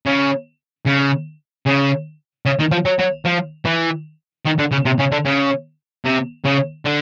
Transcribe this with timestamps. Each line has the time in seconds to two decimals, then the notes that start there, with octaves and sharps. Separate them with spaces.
0.06 C#3
0.86 C#3
1.66 C#3
2.45 C#3
2.59 D#3
2.72 F3
2.85 F#3
2.99 F#3
3.25 F3
3.65 E3
4.45 D#3
4.58 D3
4.71 C#3
4.85 C3
4.99 C#3
5.12 D3
5.25 C#3
6.05 C3
6.45 C#3
6.85 D3